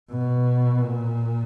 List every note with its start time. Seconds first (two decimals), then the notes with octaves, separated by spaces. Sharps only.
0.11 B2
0.81 A#2